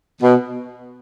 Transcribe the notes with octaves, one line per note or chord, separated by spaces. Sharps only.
B2